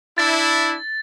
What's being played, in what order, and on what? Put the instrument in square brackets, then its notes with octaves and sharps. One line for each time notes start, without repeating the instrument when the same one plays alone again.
[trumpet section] D4 E4 [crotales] A6